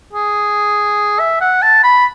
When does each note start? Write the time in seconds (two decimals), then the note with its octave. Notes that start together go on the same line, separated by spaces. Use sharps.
0.13 G#4
1.20 E5
1.41 F#5
1.62 A5
1.83 B5